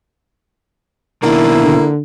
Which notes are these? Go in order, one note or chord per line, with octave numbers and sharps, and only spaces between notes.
B2 D#3 A#3 D4 E4
D3